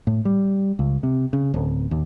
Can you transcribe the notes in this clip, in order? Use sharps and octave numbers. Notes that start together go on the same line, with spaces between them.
A2
G3
C#2
C3
C#3
D1
D#2